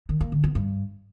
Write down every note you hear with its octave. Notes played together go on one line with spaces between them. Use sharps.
D#3
A#3
D3
B3
G2